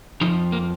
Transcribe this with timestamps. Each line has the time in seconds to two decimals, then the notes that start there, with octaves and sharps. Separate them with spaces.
0.21 F2 C3 F3 D#4
0.52 A#3